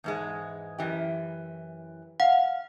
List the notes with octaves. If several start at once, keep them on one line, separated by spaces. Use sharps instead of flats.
E2 G#2 G#3
F#2 E3 G4
F5 F#5